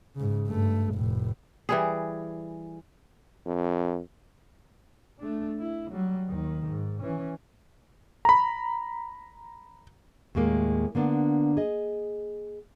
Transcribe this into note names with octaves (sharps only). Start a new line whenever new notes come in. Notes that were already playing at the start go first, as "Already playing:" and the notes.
G#2 C#3
G2 A3
F1 A2
E3 G3 G#4
F2
A3 D4
E4
F#3 G3
D#2 D#3
G#2
E3 C#4
A#5 B5
D#2 A2 G#3 A#3
D3 A#3 B3 D4
G#4 D#5